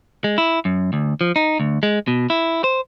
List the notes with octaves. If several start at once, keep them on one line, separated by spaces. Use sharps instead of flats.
G#3
E4
F#2
D2
F3
D#4
D2
G#3
B2
E4
C5